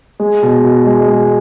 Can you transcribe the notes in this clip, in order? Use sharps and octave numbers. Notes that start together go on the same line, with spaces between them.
G#3
B2
B2
G#3
G#3